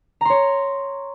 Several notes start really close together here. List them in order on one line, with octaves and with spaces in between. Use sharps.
A#5 C6 C#5